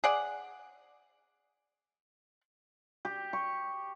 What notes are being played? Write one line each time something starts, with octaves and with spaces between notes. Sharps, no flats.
G#4 D5 F#5
G4
C#6